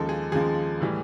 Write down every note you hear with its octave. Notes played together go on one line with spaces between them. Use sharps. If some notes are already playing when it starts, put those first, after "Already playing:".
Already playing: D#2 C#3 F3 G#3 A4
G#4
D#2 C#3 F3 G#3 G#4
A2 E3 G3